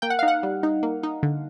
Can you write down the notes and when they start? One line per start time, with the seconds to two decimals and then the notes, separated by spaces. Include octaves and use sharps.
0.02 A#3 G5
0.10 F#5
0.19 F5
0.23 D#4
0.28 F#5
0.43 G3
0.63 D#4
0.83 A#3
1.03 D#4
1.23 D3